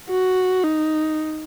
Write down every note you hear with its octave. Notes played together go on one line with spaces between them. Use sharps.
F#4
D#4